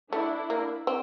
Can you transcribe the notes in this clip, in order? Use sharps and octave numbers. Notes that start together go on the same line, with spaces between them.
A3 D4 E4
A#3
C4